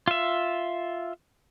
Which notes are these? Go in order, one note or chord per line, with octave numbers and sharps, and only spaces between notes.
F4 E5